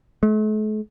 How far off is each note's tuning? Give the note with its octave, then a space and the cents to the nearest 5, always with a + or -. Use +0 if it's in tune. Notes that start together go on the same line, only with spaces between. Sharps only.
A3 -45